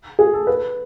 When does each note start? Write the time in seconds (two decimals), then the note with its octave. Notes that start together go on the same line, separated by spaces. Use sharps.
0.19 G#4
0.34 A4
0.47 B4